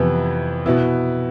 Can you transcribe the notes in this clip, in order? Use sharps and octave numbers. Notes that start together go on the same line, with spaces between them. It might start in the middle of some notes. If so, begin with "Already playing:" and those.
Already playing: F2 C3 E3 B3 E4
B2 B3 E4